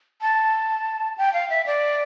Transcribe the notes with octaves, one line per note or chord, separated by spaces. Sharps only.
A5
G5
F5
E5
D5